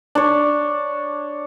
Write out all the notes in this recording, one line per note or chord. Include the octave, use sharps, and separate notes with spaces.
D4 C#5